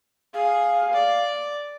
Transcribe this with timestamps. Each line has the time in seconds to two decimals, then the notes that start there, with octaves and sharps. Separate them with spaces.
0.34 G#4 F5
0.93 D5